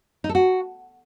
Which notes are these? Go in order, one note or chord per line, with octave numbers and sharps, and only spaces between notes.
D#4
A4
F#4